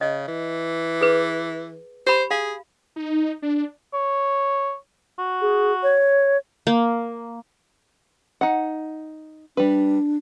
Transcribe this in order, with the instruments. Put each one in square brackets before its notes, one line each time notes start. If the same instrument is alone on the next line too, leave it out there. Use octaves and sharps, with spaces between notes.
[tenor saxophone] C#3 [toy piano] D#5
[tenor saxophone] E3
[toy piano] G#4 B4
[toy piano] G4 B5 [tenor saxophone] C5
[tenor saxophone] G#4 [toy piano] F5
[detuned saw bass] D#4
D4
[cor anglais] C#5
F#4
[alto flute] G#4
C#5
[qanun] A#3
[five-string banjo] D#4 F#5
[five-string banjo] G3 B4 [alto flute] D4